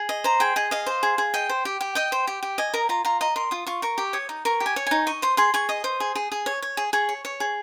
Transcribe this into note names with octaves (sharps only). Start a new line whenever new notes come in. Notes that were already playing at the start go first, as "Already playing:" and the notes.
Already playing: G#4
D#5
C5 A#5
G#4 G5
G#4 D#5
D#5 F5
C5
G#4
G#4
D#5 G5
C5
G4
G4
D#5 G5
C5
G4
G4
D#5 G#5
A#4 A#5
F4 A#5
F4 A#5
D#5 A#5
A#4 C6
F4 D#6
F4 C#6
A#4 C#6
G4
C#5 D#6
D#4
A#4 C#6
G4
G#5
C#5
D#4 G#5
D#5 C#6
C5 C6
G#4 C6
G#4 C#6
D#5 D#6
C5
G#4
G#4
G#4
C#5
C#5
G#4
G#4 C#6
C#5
C#5
G#4